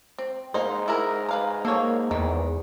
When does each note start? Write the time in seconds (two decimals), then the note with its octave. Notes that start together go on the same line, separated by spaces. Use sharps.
0.18 C4
0.54 G#2 A#3 D#4 C5
0.88 E4 G#4 A#4
1.29 B4 F5 A#5
1.65 A#3 A4 C#5
2.11 E2 D#3